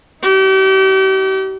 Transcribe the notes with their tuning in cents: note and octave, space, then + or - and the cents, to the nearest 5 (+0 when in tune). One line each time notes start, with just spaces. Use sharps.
D#4 +30 G4 -40